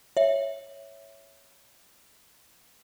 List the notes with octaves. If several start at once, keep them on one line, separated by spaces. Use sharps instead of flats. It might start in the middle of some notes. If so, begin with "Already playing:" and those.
C#5 E5